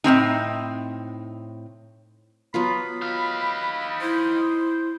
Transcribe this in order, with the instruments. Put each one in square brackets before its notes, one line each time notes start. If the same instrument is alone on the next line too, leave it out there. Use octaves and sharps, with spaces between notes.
[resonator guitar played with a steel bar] A2 A#3 C4 D#4
[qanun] F#3 B3 F4 [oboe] B5
[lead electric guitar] D#4 F5
[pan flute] E4 [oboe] C5